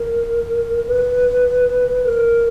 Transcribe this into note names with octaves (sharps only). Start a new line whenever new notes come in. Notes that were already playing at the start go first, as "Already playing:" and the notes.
Already playing: A#4
B4
A#4